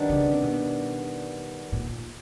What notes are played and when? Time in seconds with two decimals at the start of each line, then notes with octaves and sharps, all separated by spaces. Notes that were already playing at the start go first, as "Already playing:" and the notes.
Already playing: D#3 G3 B3 D4
0.10 C#3
0.31 C3
0.42 B2
1.72 A#2